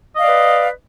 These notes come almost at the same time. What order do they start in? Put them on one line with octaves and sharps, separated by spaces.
D#5 F5 D5 B4